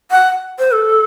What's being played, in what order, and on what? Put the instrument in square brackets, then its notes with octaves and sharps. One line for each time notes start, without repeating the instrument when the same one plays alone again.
[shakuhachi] F#5
C5
A4